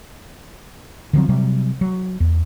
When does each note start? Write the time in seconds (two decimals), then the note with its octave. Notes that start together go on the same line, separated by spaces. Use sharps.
1.13 D3 F3 F#3 C4
1.29 C3 F#3 G3
1.81 F#3
2.20 E2